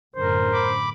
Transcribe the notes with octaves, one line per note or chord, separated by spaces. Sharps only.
F#2 A2 D3 A#4 C5
B5 D6